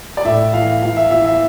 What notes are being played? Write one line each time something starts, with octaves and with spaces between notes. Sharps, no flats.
D5
A2 E5
E3 F5
E3 F5
E5
E3 E5
E5